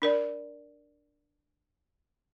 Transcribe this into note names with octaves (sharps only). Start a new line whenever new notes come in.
D4 A#4 D5